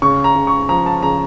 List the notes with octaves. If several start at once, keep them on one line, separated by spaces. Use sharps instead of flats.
C#3 C#6
A#5
C#3
C#6
F3 A#5
A5
C#3 A#5